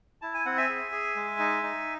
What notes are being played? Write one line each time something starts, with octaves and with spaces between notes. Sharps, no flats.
E4 A5
G#5
C4 F#5
E5 G#5
G#4
G#4
G#3
D#4
D#4